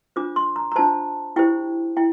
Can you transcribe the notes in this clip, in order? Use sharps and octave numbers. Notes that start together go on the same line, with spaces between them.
D4 F4 C5 D6
C6
A#5
A#5
D4 F4 C5 A5
E4 G4 C5 G5
E4 G5